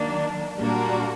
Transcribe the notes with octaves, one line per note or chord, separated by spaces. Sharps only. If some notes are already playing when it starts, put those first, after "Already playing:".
Already playing: D#3 F#3 A#3 D4
A#2 G3 A#3 D4 F#4